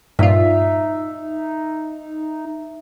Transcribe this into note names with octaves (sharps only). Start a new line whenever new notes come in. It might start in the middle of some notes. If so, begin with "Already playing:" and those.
G2 A#2 D#4 F4 E5